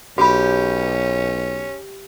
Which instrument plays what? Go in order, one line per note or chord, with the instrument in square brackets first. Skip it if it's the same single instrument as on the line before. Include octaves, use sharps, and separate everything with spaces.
[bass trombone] B1 [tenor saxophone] C#4 [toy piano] F#4 B5 [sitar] G4